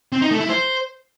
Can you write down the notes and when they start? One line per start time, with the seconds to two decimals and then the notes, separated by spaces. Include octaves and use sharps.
0.12 C4
0.22 D#4
0.31 A3
0.40 E4
0.50 C5